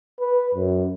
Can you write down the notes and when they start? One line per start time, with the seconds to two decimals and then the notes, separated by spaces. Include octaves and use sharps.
0.19 B4
0.55 F#2